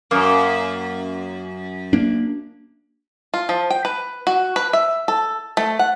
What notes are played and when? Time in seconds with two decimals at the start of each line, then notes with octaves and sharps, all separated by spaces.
0.11 F#2 A#3
1.93 A#3 D4
3.34 F4
3.49 F3
3.70 G5
3.85 B4
4.27 F#4
4.56 B4
4.73 E5
5.08 A4
5.57 A3
5.79 F#5